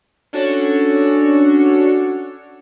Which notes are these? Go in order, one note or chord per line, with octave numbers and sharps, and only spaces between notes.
C#4 D4 F#4 A4 C#5